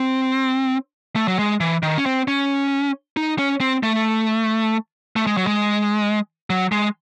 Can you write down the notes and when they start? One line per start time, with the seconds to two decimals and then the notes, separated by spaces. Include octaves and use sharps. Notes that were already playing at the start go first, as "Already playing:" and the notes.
Already playing: C4
1.16 A3
1.28 F#3
1.39 G#3
1.60 E3
1.83 D#3
1.98 C#4
2.06 C4
2.28 C#4
3.17 D#4
3.38 C#4
3.61 C4
3.83 A3
5.16 A3
5.27 G#3
5.37 F#3
5.47 G#3
6.50 F#3
6.72 G#3